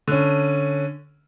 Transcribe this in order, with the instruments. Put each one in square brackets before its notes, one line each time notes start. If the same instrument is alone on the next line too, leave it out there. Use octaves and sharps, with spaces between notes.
[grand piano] D3 C#4